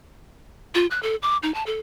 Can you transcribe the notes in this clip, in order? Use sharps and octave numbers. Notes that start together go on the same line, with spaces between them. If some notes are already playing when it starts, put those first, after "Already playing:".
F4
F#6
A4
D6
D#4
A5
A4